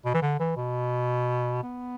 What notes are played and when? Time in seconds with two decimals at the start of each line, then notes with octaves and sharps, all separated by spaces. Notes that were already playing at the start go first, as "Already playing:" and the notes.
0.05 B2
0.14 E3
0.22 D3
0.39 E3
0.57 B2
1.63 B3